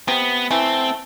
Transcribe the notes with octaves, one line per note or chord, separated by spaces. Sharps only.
C3 B3
E3 A3 C4